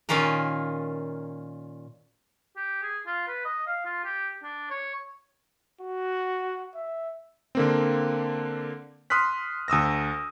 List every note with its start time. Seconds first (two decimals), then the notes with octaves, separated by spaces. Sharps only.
0.09 A#2 D#3 C#4 F4 A#4
2.56 G4
2.82 G#4
3.06 F4
3.28 B4
3.45 D#5
3.67 F5
3.85 F4
4.04 G4
4.43 D4
4.70 C#5
5.81 F#4
6.75 E5
7.55 D3 A#3 C4
9.10 C6 D#6 F6 F#6 B6
9.68 D2 D#6 E6 A#6